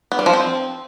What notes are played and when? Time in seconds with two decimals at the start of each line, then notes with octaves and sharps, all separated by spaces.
0.12 B3
0.19 G3
0.26 F3
0.33 C4